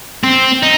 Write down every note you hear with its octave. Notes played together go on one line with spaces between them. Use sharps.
C4
D#4